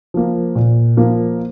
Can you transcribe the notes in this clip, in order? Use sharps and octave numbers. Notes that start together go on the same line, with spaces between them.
F3 A#3
A#2
F3 A#3